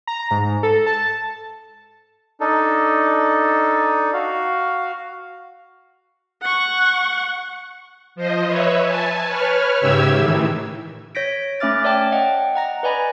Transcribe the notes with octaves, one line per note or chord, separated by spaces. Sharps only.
A#5
G#2
A4
A5
D4 D#4 A4
F#4 F5
F#5 C#6
F3 C5 D#5
B4 C#5 E5
G#5 A5
B4 C#5 F6
G#2 C#3 G4 E5 E6 G#6
A2 D#3 E3
C#5 G6 A#6 B6 D7
A3 C#4 E5 D6 F6 A6
C#5 D5 E5 G5 A5
D#5 F#5 G5
F#5 A#5 A#6
B4 D5 D#5 G#5 B5 A#6